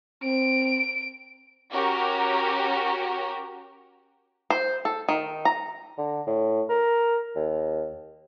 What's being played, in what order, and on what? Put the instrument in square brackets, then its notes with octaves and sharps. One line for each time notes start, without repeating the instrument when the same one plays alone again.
[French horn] C4 [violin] D7
[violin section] C#4 F#4 G4 A#4
[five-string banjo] C5
A4
D#3
A#5
[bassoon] D3
A2
A#4
D#2